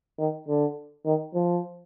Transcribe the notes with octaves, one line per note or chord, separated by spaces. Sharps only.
D#3
D3
D#3
F3